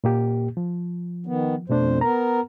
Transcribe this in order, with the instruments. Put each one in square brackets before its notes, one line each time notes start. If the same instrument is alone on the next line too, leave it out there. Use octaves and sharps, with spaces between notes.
[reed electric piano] A#2 A#3 G4
F3
[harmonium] D#3 B3
[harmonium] F2 C5 [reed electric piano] B2 A3 D4
[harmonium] B3 A#4 [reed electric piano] A#5